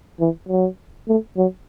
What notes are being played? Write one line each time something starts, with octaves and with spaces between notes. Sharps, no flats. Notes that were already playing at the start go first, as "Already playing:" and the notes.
E3
F#3
A3
F#3